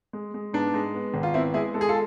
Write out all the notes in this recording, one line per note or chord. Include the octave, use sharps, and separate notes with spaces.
G#3
G#3
G#2 B3 D4
G#3
B3
G#1
F4
B3 C4 E4
G#3 E4 G#4
G#3 A4
G#4
F4 A4